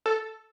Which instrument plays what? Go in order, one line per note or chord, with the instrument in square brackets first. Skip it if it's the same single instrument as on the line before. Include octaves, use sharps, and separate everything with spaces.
[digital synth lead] A4